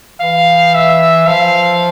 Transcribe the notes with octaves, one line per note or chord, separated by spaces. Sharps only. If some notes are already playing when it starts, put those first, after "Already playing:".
E3 F5
E5
F3 F5